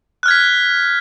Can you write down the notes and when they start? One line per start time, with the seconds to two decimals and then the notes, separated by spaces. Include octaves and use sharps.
0.23 F#6
0.26 F6
0.28 G#6
0.31 B6